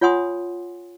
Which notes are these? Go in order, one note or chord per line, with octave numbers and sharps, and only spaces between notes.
F4 C#5 F#5 G#5 C6 D#6